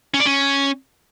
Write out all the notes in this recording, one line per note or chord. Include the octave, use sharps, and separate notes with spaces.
C#4
D5
C#4